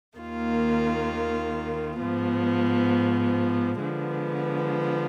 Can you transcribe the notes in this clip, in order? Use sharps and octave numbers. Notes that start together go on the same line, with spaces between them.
D#2 D#3 A#3 F4
G#2 F3 B3
D3 F3 G#3 B3